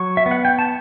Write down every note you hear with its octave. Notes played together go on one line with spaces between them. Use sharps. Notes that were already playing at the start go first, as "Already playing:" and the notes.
Already playing: F#3 C#6
E5
B3
F#5
G5
A5